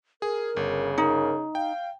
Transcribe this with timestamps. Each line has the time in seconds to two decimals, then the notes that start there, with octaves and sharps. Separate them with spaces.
0.22 G#4 A#4
0.57 G1 C#3
0.98 D#4 A#4
1.55 F5 G5